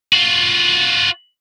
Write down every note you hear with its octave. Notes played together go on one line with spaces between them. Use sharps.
F4 F#4